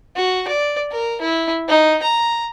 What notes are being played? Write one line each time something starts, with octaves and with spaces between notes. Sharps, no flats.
F#4
D5
A#4
E4
D#4
A#5